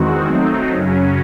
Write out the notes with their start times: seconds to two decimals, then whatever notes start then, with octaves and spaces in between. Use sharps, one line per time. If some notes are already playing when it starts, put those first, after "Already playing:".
Already playing: E2 D#3 G#3 C4 F#4
0.28 F#3 A3 C4 D#4
0.71 F#2 C#3 F#3 C#4